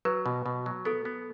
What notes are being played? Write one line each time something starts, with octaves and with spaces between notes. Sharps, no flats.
F#3 B4
B2
B2
F#3
B3 A4
B3